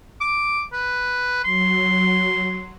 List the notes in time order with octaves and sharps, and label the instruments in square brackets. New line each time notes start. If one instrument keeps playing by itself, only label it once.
[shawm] D6
B4
[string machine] F#3 [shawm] C6